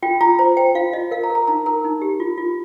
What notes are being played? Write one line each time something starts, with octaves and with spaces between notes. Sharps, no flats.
F4 G5
F4 A#5
C5 A#5
C5 G5
F4 F5
F4 D#5
A#4 F5
A#5
A#4
A#5
D#4 A#5
A#4 A#5
D#4
G4
F4
F4